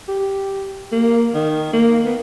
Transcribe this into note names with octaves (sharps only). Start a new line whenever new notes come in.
G4
A#3
D#3
A#3
B3